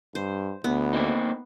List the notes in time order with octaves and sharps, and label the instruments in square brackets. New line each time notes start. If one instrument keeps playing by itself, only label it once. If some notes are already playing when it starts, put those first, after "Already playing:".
[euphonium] G2 [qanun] C5
[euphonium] D2 [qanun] B3
[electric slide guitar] A#3 C4 D#4